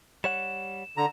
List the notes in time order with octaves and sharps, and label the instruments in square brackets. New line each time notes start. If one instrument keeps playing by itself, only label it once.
[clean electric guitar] G3 C#5 F#5 [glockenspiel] E7
[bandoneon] D3 A#5